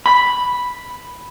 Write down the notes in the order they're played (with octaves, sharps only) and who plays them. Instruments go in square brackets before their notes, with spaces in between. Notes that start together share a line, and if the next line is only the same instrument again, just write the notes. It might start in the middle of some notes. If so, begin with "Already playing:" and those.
[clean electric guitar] B5